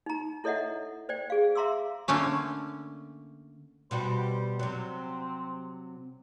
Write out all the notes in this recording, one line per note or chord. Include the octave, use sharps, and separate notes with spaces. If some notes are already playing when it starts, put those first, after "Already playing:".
D#4 A#5
E4 A4 C#5 D#5 E5 F#5
C5 D5 G5
G#4 F5
E5 F5 A#5 C6 D6 E6
D3 A3 A#3 C#4
B2 G3 F#4 C5
C3 F#3 C4